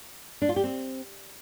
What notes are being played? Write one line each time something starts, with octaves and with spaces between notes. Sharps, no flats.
D4
F4
G4
C4